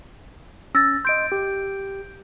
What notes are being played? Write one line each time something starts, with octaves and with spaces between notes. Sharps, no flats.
C#4 E6 A6 A#6
D#5 C6 G6 D7
G4